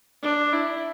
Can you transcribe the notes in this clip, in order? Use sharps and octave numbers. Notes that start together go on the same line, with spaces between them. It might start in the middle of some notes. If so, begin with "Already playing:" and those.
D4
E4